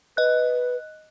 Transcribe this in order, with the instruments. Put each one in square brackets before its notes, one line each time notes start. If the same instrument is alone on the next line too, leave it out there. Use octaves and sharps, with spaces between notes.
[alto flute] B4 [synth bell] D#5 F#6